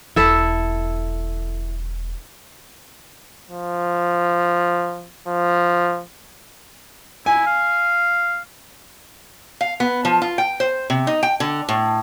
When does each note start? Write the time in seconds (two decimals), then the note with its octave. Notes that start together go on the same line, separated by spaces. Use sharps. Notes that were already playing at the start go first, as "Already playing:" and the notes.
0.16 E1 D3 E4 A4 E5
3.50 F3
5.27 F3
7.26 E4 G#5
7.47 F5
9.61 F5
9.80 B3
10.05 F3
10.22 F4
10.38 G5
10.60 C5
10.90 C3
11.07 D#4
11.23 G5
11.40 D3
11.69 A2